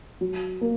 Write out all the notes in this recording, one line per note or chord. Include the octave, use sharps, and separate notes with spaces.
F#3
A#3